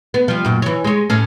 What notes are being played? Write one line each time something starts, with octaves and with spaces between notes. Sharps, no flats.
B3
F3 G3
F#2 A#2
E3 C#5
G#3 C#5
A2 C#4